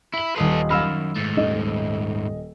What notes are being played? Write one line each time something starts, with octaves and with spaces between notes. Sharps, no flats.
E4 B6 F#7
D#1 A4 B4 D#5 C6
F#2 F5 B5 E6 F6
G#2 A3 A6 C#7
D#1 D#5